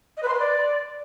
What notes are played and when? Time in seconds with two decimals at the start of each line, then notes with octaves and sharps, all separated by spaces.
0.17 D#5
0.23 B4
0.28 C6
0.34 B4
0.39 D5